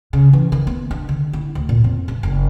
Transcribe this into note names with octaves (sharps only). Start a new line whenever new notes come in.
C#3
E3
D#3
B3
D4
D3
E4
D2
A#2
F2
G2
F#1